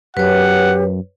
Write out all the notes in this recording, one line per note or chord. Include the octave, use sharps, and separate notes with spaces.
F#2 G4 B4 C#5 F#5